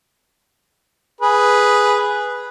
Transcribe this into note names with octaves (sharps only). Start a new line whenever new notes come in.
G#4 B4